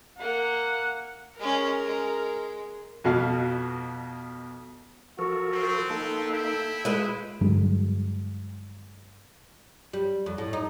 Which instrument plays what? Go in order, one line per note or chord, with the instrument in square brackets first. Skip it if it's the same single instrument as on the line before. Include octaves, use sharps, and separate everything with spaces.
[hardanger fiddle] A#3 A#4 [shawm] F#5
[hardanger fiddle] G#3 C#4 [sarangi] A#4
[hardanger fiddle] G#3
[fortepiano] F2 B2 F#4 F5
[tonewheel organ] F3 A4 A#4 [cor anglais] F#4
[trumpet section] B3 C4
[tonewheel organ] A#3 D#4 [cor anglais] A4
[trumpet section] E4 E5 G5
[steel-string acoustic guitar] G#3 B4 [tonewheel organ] F4
[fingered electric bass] G2 D3 F#3 G#3
[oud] G3
F2
A2
D#4